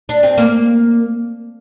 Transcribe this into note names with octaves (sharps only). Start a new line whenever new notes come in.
D4
C4
A#3